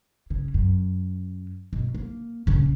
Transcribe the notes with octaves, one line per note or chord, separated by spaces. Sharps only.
C#3
F#2
B2
A#3
A#1 C#3